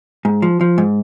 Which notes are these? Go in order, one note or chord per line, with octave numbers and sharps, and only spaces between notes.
G#2
F3
F3
G#2